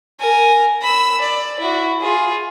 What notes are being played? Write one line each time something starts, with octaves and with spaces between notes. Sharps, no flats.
A#4 G#5
B5 E6
D5
E4 F#4
F4 G#4